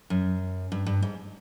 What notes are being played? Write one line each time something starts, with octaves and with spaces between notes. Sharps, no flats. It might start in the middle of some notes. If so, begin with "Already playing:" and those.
F#2
G2
G2
G#2